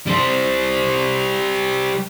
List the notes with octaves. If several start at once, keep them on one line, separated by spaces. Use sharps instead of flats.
G3 C5